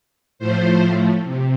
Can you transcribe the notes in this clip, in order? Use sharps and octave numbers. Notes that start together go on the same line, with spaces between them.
A2 F3 A3 C5
C3